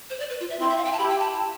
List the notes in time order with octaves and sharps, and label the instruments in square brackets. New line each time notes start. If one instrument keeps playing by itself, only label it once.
[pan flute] C5
D5
B4
F4
E5
[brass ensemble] C4 E4 [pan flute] C6
[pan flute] E5
F5
G5
A5
[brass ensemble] E4 G4 [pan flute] B5
[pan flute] G5
A5